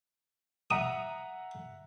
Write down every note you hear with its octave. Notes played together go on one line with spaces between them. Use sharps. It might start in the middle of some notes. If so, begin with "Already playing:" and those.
E5 F#5 A#5 D#6